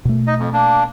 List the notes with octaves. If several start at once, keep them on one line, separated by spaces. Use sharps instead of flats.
B2 A3
D#4 D#5
F2
A#3 D4